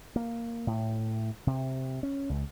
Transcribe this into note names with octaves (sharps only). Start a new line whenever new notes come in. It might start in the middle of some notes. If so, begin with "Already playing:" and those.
A#3
A2
C3
C#4
C#2